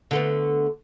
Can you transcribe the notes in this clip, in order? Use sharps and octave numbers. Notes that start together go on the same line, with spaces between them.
D3 A3 B3